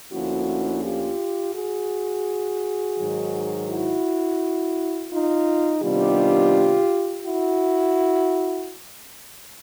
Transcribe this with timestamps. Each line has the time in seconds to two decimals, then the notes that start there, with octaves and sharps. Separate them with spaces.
0.13 D2 D3 F3 A#3 C#4 E4 F#4
0.84 F4 G4
1.55 F#4 G#4
2.97 G#2 D#3 F#3
3.69 E4 F#4
5.11 D#4 F4
5.82 C3 D#3 G3 B3 D4 F4 G4
7.25 E4 F#4